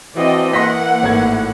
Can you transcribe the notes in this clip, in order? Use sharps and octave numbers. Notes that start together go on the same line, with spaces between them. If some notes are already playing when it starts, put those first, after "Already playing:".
E3 C4 F#4 D5 D#5 A5
A#3 F#5 C6 A#6 B6
G#1 A2 G#6